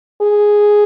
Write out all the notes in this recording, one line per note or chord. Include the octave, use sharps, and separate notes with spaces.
G#4